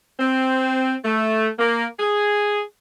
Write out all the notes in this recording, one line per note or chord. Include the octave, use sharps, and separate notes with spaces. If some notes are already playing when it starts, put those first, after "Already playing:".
C4
A3
A#3
G#4